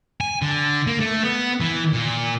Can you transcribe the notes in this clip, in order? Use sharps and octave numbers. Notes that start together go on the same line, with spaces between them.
G#5
D3
A#3
A3
B3
E3
A#2